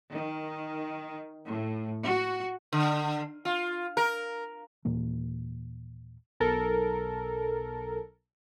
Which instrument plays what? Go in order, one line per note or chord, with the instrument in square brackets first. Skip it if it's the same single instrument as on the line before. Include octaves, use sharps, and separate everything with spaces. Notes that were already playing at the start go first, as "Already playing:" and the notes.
[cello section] D#3
A2
F#4
[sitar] D3
F4
A#4
[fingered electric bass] D#2 A#2 E3 A#3
[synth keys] B1 A4 A#4